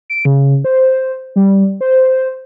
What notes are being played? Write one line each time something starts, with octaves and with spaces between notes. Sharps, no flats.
D7
C#3
C5
G3
C5